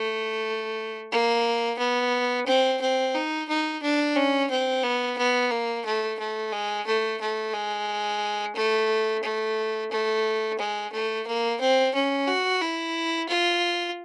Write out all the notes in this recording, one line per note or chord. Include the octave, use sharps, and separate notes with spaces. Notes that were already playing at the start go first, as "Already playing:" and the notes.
Already playing: A3
A#3
B3
C4
C4
D#4
D#4
D4
C#4
C4
B3
B3
A#3
A3
A3
G#3
A3
A3
G#3
A3
A3
A3
G#3
A3
A#3
C4
C#4
F#4
E4
F4